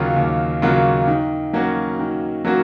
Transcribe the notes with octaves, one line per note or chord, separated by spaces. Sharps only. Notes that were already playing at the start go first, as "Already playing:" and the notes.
Already playing: D#2 C#3 F#3 A#3 F4
D#2
C#3 F#3 A#3 F4
D#3
F#3 A#3 C#4 F#4
D#3
F#3 A#3 C#4 F#4